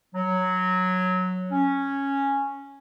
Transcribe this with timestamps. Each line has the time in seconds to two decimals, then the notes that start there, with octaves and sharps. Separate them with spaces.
0.14 F#3
1.52 C#4